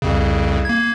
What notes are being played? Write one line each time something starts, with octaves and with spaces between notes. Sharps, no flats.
C2 F2 C#3
A#3 G#6